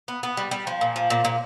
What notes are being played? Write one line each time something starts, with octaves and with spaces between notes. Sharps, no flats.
B3
B3
G3
G3
F3
A#2
F3
A#2
A#2